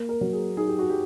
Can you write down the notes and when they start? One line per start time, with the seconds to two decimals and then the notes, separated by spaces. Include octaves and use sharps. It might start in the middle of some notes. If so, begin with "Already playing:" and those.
Already playing: A#3
0.09 A#4
0.21 F#3
0.33 G#4
0.57 D#4 G#4
0.68 G4
0.79 F#4
0.90 G4